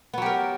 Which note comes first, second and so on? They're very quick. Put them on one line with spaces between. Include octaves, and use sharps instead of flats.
B3 F#3 G4 A#4